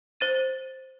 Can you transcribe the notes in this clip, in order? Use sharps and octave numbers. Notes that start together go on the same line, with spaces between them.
C5 A6 D#7